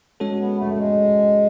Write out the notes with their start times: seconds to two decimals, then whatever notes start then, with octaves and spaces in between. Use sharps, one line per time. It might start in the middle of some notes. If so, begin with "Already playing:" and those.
0.20 G#3 C#4 F#4 A4 C#5
0.40 B3
0.59 A3
0.73 A3
0.78 G#3